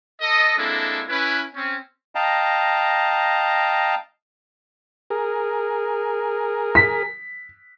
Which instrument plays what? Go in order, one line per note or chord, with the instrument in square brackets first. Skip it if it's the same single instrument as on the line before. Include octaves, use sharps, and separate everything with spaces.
[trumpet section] A4 D#5
G#3 A#3 C4 D4 E4 A4
C#4 E4 B4
C4 C#4
[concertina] D#5 F5 G5 A5 A#5
[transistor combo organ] G#4 A#4
[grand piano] B6